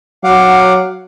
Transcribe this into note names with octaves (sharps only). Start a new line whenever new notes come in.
F#3 F5 F#5 D6